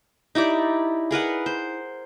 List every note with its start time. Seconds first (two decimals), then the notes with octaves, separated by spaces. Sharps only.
0.35 D#4 E4 G4 D5
1.11 G#4 A#4 B4 F#5
1.46 C5